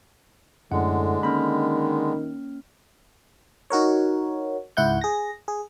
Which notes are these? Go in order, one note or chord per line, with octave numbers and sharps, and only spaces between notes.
F#2 A2 D3 G#3 F#5
D#3 A#3 C#4 B5 F6
D#4 F#4 A#4 C#5
C#2 G#2 E4 F#5 G6
G#4 A#6
G#4